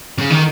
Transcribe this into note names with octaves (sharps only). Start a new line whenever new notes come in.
C#3
D#3